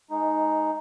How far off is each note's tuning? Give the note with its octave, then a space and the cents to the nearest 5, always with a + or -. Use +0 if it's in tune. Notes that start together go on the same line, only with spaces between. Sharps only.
G#3 +15 D#4 +0